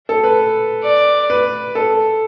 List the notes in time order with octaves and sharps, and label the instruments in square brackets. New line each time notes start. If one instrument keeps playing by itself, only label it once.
[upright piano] A4
B4
[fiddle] D5
[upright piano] B4
A4